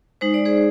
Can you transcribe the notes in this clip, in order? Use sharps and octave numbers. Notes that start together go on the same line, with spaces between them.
G#3 D#4 C5
D5
G#4 C5